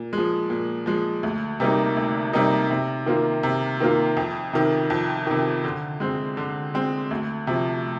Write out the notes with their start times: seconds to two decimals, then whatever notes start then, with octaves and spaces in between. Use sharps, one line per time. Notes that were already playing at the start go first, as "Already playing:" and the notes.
Already playing: A#2
0.13 F3 G#3
0.50 A#2
0.86 F3 G#3
1.23 D2
1.60 C3 G3 A#3 D#4
1.97 D2
2.33 C3 G3 A#3 D#4
2.70 C3
3.06 D#3 A#3 F4
3.43 C3
3.80 D#3 A#3 F4
4.17 F2
4.53 C3 D#3
4.90 F2
5.27 C3 D#3
5.64 D3
6.00 G#3 C4
6.37 D3
6.74 G#3 C4
7.11 D2
7.47 C3 F3